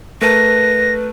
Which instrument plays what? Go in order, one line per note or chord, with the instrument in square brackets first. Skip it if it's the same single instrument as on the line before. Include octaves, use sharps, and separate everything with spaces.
[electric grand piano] A3 A#4 A5 [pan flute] B4 [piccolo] A#6